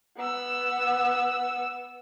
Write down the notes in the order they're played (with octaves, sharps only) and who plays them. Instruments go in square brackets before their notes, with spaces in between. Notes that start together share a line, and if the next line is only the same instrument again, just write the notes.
[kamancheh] B3 E6